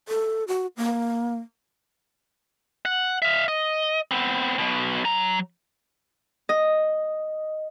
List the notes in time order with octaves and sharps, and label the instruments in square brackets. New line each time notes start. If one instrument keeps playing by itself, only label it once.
[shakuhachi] A4
F#4
A#3
[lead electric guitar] F#5
E5 F5
D#5
B3 C4
B1 B2
F#3 A#5
[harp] D#5